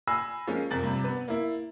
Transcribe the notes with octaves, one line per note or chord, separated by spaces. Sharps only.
G#5 B5 E6 A#6 C7
F3 G#3 A#3 C#4
F2 C3 A#4 A6 F#7
G2 C3
B3 B4
A#3 E4